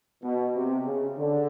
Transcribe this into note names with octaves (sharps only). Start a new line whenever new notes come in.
B2
C3
C#3
D3